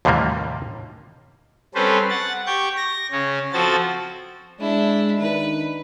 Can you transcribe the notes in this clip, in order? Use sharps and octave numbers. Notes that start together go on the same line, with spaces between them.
D#2 A2 C3 E3 G3 A#3
G3 C4 C#4 A4 B4 C5
F#5 A6
G4 C#6 G6
A#6
C#3 C#4
F3 C4 F#4 A4 C5 A6
G#3 D4 E4
D#3 D4 D#4 B4